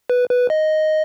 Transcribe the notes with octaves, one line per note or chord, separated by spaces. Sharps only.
B4
B4
D#5